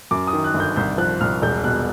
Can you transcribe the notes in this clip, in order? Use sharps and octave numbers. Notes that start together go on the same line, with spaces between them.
F#2 D6
D#6
D#3
F#6
G1
G6
C2 G6
F3 F#6
C2 F6
E1 G6
B2 F#6